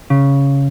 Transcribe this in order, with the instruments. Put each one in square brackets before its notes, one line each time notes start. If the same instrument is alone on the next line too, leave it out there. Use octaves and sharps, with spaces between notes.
[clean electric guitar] C#3